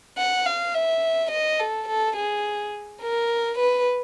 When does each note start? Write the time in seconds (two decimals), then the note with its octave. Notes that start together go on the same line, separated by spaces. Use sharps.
0.18 F#5
0.46 F5
0.74 E5
1.31 D#5
1.60 A4
1.88 A4
2.16 G#4
3.02 A#4
3.58 B4